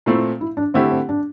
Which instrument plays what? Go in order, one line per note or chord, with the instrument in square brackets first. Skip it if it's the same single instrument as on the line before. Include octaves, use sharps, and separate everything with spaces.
[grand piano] A#2 A3 C4 [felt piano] E4
[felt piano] E4
D4
[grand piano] D3 A3 E4 G4 [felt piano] C4
[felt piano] C4
D4